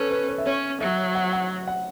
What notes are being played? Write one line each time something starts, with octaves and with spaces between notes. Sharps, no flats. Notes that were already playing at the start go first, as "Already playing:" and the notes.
Already playing: C#4 A4 B4 C#5
B4
B4
E5
C#4 C#5
F#3 E5
F#5
F#5
F#5